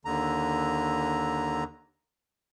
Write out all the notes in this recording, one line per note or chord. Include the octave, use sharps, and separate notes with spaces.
D#2 D3 A#5